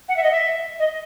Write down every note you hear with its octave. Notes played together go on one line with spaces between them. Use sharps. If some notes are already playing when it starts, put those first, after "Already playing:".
F#5
E5
D#5
E5
D#5